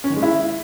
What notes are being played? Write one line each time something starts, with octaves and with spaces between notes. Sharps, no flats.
C#4
D#3
G#3
E4